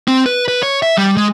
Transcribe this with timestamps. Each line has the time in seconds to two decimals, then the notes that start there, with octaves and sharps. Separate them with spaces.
0.08 C4
0.26 B4
0.48 B4
0.63 C#5
0.82 E5
0.98 G3
1.17 G#3